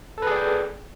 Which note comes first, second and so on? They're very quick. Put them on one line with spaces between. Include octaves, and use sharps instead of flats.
A4 B4 G#4 D5 G5